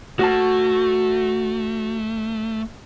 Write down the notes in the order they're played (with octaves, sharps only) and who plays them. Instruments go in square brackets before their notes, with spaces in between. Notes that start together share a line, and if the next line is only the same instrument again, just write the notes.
[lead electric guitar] A3 [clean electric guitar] F#4 A5